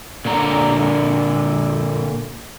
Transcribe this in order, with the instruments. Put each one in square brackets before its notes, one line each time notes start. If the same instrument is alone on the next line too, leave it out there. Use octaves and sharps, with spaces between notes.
[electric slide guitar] A#2 D3 C#5 A#5